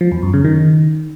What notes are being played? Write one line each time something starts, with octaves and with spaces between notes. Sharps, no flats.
F3
E2
F#2
C#3
D#3